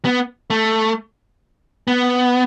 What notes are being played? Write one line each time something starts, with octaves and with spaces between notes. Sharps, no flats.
B3
A3
B3